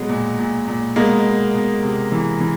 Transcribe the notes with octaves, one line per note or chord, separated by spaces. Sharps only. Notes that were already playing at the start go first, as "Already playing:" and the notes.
Already playing: B2 F#3 G#3
A#2
A#2
A#2
B2 G#3 A#3
B2
B2
C3
E3
E3